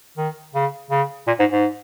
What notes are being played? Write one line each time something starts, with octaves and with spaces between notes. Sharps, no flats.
D#3
C#3
C#3
A#2
G#2
G#2